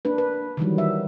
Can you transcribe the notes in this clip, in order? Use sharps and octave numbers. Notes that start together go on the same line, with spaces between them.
A#3 D4 B4
B4
D#3 E3 F#3 G3
E5